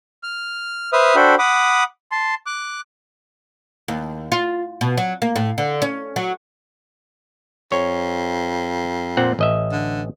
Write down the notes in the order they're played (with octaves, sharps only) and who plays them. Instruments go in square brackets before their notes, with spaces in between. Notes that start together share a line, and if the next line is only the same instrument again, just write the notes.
[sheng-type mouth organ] F6
B4 C5 E5 D#6 F6
D4 F#4 A4 C5 G5 B5
F#5 B5 D6 D#6
A5 C6
D6 F#6
[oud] D#2
F4
B2
F#3
A#3
A2
D3
C#4
F#3
[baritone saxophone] F2 [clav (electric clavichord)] C#5
[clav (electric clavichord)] A#2 C4 F#5
A1 D#5 E5
[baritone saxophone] D3